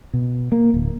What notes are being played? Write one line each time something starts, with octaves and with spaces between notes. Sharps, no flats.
B2
A#3
D1